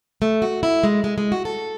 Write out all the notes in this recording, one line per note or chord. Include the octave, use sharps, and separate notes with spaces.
A3
F#4
E4
G#3
G#3
G#3
F#4
A4